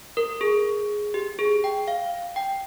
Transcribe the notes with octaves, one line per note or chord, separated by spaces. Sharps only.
A#4
G#4
G4
G#4
G5
F5
G5